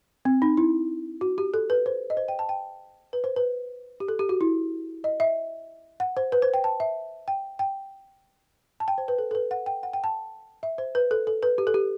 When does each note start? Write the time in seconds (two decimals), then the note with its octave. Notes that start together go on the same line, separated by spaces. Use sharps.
0.25 C4
0.42 D#4
0.57 E4
1.21 F#4
1.38 G4
1.54 A4
1.70 B4
1.86 C5
2.10 D#5
2.17 C5
2.28 G5
2.39 A5
2.49 G5
3.13 B4
3.24 C5
3.36 B4
4.00 G4
4.08 A4
4.19 G4
4.29 F#4
4.41 E4
5.04 D#5
5.20 E5
6.00 F#5
6.17 C5
6.32 B4
6.42 C5
6.54 G5
6.64 A5
6.80 E5
7.28 G5
7.59 G5
8.80 A5
8.88 G5
8.98 C5
9.08 B4
9.19 A4
9.31 A4
9.35 B4
9.51 F#5
9.66 G5
9.83 F#5
9.93 G5
10.04 A5
10.63 E5
10.78 C5
10.95 B4
11.11 A4
11.27 A4
11.43 B4
11.58 G4
11.67 A4
11.74 G4